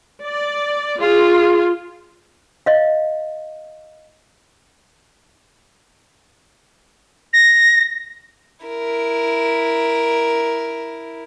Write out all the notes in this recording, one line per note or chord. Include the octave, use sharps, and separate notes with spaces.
D5
F4 G#4
D#5 F5
A#6
E4 A#4